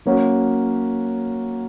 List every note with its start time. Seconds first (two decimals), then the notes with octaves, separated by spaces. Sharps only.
0.05 F#3 A#3 C#4 F#4